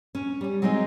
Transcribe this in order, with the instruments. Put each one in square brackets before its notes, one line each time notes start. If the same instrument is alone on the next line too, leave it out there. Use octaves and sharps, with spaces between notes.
[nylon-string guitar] C#4
G3 C#4
F#3 G#3 C4 D#4 D#5